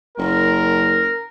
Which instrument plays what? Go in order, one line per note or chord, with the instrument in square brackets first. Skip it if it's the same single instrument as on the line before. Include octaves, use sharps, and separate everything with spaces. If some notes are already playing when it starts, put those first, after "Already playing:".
[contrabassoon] F#1 [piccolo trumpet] A#4